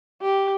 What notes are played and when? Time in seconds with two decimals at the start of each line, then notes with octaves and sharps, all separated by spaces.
0.22 G4